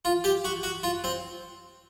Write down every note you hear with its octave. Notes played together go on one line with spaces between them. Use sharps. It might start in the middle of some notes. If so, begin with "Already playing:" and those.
F4
G4
F#4
F#4
F4
C4